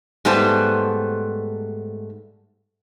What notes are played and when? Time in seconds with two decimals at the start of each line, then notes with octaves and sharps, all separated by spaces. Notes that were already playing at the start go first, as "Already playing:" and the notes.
0.25 G#2 G3 A3 B3 C5 A5